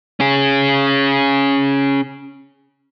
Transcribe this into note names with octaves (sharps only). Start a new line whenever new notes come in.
C#4 G#4